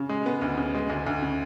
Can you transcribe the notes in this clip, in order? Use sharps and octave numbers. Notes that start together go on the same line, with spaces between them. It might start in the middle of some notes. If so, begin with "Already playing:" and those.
Already playing: C#3
G#3
B3
D2
C#3
G#3
D2
D2
C#3